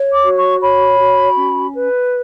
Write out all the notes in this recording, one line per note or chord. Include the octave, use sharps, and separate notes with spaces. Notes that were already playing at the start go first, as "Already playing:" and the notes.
Already playing: C#5
D6
F#4
C#6
C#5 B5
F#4
C#4
B4